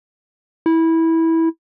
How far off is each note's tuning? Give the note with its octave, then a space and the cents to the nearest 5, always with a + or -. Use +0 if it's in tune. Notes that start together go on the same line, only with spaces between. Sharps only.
E4 -15